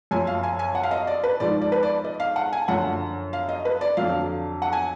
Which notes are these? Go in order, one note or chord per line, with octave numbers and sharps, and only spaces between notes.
F#2 F3 G#5
F5
G#5
G#5
F#5
F5
D#5
D5
B4
G#2 F3 D5
D5
B4
D5
D#5
F5
F#5
G#5
F#2 D3 F3 F#5
F5
D#5
B4
D5
F2 D3 F#3 F5
F#5
G#5